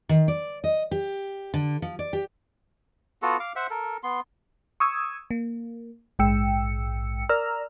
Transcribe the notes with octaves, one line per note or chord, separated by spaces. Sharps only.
D#3
D5
D#5
G4
D3
F3
D5
G4
B3 F4 F#4 A4
F5 D6
C5 E5 F#5
A4 A#4
B3 C6
C#6 D#6 E6 G#6
A#3
A#1 G#2 G#3 G5 E6 C#7
A#4 D5 A#5 E6 F6